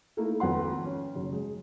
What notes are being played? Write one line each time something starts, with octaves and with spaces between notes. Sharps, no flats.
A3 A#3 D#4 E4 A4 A#4
G#1 F2 B4 F#5 C6
C#4
F#1
G#3